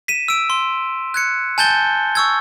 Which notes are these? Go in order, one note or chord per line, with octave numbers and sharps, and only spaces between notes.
B6 D#7 E7
E6 D7 D#7
C6
F#6 G#6 C#7
G#5 A5 G6 A6 G7
C#6 E6 G#6